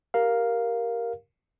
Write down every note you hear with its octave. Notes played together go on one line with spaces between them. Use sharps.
G4 A#4 F5